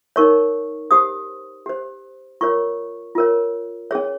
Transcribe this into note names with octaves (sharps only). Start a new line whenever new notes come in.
D#4 A#4 C#5 C#6
G4 C5 D#6
G4 C5
F4 A#4 C#5 C#6
F4 A#4 C#5
C#4 G#4 C#5